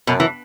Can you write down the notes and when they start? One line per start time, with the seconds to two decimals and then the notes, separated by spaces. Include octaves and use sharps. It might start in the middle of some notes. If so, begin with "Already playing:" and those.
0.07 F#2 B2
0.20 E3